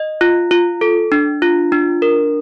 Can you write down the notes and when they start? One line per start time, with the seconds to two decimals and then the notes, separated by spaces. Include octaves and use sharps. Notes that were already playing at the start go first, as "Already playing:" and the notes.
Already playing: D#5
0.21 F4
0.51 F4
0.81 A4
1.12 D4
1.42 F4
1.72 D4
2.02 A#4